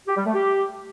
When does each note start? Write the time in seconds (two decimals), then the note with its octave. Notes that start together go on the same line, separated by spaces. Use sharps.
0.07 G4
0.16 G3
0.25 A3
0.34 G4